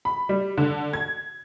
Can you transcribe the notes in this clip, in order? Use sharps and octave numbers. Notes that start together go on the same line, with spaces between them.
B5
G3
D3
G#6